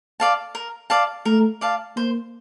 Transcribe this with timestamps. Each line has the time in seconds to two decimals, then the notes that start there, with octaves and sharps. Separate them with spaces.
0.20 D5 F5 A5
0.55 A#4
0.90 D5 F5 A5
1.25 A3 A#4
1.61 D5 F5 A5
1.96 A#3 C5